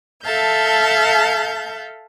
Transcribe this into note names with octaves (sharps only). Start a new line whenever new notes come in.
A4 E5 F5 A5 G6